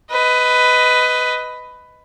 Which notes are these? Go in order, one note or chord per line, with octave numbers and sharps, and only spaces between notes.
B4 D#5